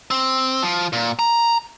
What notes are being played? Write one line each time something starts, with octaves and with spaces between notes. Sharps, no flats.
C4
F3
A#2
A#5